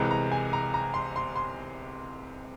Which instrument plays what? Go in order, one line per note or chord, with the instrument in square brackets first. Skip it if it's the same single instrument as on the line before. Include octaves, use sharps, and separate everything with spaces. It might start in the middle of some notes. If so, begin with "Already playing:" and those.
Already playing: [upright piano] C2 C3 E3 G#3 A#5
A#5
G#5
A#5
A#5
C6
C6
C6